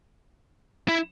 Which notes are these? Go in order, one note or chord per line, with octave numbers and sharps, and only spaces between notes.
E4